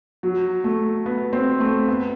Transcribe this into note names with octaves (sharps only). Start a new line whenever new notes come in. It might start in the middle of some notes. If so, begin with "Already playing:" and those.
F#3
A3
B3
C4
A3
B3